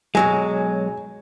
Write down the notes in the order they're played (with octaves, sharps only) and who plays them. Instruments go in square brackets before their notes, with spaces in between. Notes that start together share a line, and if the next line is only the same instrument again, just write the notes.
[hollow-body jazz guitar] B1 F#3 G#3 [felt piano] G#5